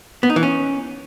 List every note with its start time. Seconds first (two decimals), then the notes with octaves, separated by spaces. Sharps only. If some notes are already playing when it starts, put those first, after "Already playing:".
0.23 B3
0.30 D#4
0.36 E3
0.43 C#4